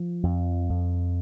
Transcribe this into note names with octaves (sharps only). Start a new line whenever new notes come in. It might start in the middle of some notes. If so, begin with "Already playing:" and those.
Already playing: F3
F2
F2